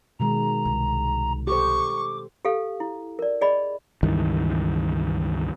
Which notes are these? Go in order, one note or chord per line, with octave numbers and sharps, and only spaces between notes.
B2 D#3 G#3 A#5
C2
G4 A4 C5 C#6 D6
G4 A4 F5
E4
A#4 D5
G#4 D5 D#5 B5
C#2 G2 D#3 E3